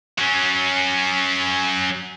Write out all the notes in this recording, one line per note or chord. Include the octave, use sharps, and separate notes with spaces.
F#3 C#4